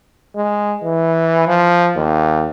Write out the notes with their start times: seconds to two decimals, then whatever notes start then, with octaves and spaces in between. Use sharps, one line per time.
0.35 G#3
0.83 E3
1.47 F3
1.96 D#2